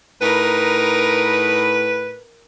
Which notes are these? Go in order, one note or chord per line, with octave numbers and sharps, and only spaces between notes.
A2 D#4 A#4 B4